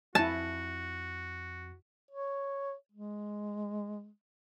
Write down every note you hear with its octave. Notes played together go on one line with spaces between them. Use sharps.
F2 E4 F#4 G#5 A5
C#5
G#3